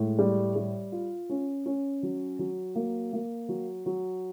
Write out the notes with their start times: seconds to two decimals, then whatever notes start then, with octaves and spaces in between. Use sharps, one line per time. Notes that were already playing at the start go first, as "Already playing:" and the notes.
Already playing: A2 G#3
0.18 G3
0.56 G3
0.92 F4
1.30 C#4
1.66 C#4
2.03 F#3
2.39 F#3
2.75 A#3
3.13 A#3
3.48 F#3
3.86 F#3